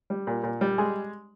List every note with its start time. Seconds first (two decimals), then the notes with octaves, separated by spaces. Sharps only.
0.10 G3
0.27 A#2
0.44 A#2
0.61 G3
0.78 G#3 G#4